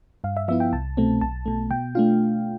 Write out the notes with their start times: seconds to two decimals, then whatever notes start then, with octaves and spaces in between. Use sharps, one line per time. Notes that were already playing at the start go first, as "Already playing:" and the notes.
0.24 G2 F5
0.37 E5
0.48 F3 B3 E4 E5
0.60 G5
0.73 C2 A5
0.97 B2 A3 C4
1.21 B1 A5
1.46 B2 A3
1.71 B2 G5
1.95 A3 D4 F4 F5